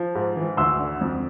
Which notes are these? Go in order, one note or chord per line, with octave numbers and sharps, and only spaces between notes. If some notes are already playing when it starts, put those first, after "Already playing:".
Already playing: F3
G#2
E3
D2 C6 E6
D3
F2